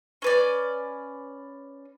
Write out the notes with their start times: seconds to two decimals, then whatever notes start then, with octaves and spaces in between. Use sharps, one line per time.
0.22 C#4 B4 D5